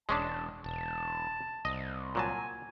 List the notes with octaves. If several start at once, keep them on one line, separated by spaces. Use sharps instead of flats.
E1 G#3 C#4 D4 A5
E1 A5
C2 D#5
A#2 F#3 G#5 A5